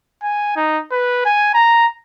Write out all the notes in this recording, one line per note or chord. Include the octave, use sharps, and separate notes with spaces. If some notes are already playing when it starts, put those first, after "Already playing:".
G#5
D#4
B4
G#5
A#5